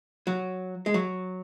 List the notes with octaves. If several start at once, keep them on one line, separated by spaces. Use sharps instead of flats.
F#3
G#3
F#3